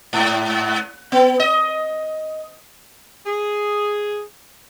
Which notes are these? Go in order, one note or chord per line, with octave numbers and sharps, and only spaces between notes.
G#2
B3
D#5
G#4